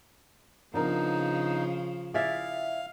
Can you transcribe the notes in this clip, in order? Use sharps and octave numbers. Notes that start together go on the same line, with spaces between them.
C#3 F3 B3 D4 D#4 A#4
E4 G#4 D5 E5 F5